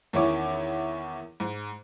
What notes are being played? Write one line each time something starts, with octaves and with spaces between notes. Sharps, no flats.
E2 D#3 C#4 E4 C#5 D6
G#2